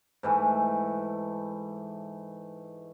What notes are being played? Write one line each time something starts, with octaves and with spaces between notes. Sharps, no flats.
G#2 E3 A3